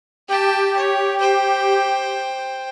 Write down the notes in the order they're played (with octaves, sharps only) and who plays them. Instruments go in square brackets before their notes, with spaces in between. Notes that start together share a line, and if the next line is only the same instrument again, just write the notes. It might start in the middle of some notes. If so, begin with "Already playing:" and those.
[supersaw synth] G4 [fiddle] G5 A5
[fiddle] C#5
C5 G5